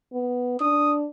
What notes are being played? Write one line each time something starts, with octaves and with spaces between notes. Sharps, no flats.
B3
D4 D#6